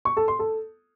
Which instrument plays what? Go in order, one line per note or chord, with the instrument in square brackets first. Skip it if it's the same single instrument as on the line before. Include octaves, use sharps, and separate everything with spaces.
[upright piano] C#6
A4
C6
A4